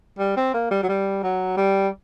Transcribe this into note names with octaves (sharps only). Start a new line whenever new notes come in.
G3
C4
A#3
G3
F#3
G3
F#3
G3